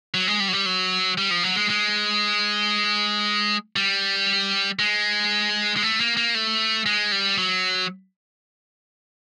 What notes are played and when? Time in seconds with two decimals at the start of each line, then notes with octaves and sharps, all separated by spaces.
0.14 F#3
0.27 G#3
0.40 G3
0.48 F#3
0.53 G3
0.66 F#3
1.18 G3
1.31 F3
1.43 F#3
1.56 G#3
1.70 G#3
3.76 G3
4.79 G#3
5.77 G#3
5.83 A3
6.00 A#3
6.17 A#3
6.35 A3
6.86 G#3
7.12 G3
7.38 F#3